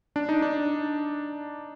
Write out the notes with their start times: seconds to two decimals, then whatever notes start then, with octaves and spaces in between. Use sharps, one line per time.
0.16 D4
0.29 D#4
0.42 D4